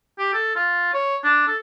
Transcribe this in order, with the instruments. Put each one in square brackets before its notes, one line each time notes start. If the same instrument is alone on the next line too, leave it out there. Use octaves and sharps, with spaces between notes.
[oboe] G4
A4
F4
C#5
D4
A4